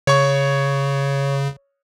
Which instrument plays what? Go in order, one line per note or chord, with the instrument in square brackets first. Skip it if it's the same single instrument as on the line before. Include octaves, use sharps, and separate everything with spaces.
[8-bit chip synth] C#3 [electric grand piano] C#5 C#6